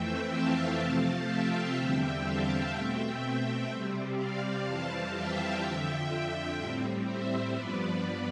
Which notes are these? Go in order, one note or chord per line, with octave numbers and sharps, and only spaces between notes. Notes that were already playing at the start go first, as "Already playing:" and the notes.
Already playing: F2 E3 A3 C4 E5 G5
F5 A5
C3 F3 A3 C4 F5 A5
E5 G5
E2 D3 G3 C4
F5 A5
B2 A3 C4 E5 G5
E5 G5
C3 G3 C4
D5 F5
F2 E3 G3 C4 F5 A5
E5 G5
F2 D3 F3
A2 G3 C4
C5 E5
G2 F3 B3 B4 D5